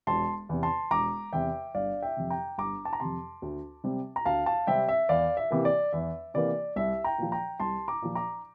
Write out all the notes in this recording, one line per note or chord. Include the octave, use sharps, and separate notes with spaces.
E1 A5 C6
E2 C3
A5 C6
E1 A#5 D6
E2 C3 E5 G5
G1 D5 F5
E5 G5
F2 C3
G5 A#5
G1 A#5 D6
A5
A#5
F2 C3 A5 C6
D2
C3 G3 C4
A#5
D2 F5 A5
F5 A5
C3 G3 C4 E5 G5
E5
E2 D5 F5
E5
C3 E3 A#3
D5
E2 E5
C3 E3 A#3 D5
C2 E5
G5 A#5
A#2 F3
G5 A#5
C2 A5 C6
A#5 D6
A#2 F3
A#5 D6